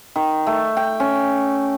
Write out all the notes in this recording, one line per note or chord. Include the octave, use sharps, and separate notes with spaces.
D#3
A3
G5
C#4